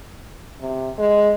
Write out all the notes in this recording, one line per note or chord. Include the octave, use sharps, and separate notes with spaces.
C3
G#3